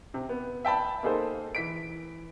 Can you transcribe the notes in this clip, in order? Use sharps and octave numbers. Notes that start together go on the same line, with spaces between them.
C3
B3
E5 G5 A5 B5
A#3 D#4 G#4 A4 C5
E3 B6 D7